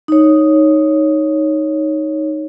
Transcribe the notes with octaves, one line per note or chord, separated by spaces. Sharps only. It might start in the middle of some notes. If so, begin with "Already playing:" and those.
D#4 C#5